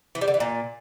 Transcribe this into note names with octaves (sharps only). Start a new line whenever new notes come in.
E3
G3
D3
E3
A#2